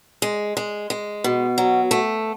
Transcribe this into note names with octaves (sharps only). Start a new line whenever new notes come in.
G#3
G#3
G#3
B2
F#3
A3